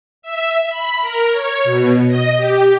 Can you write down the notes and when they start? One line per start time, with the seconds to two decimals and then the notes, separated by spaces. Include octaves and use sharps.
0.22 E5
0.69 B5
1.01 A#4
1.31 C#5
1.64 B2
2.07 D#5
2.36 G4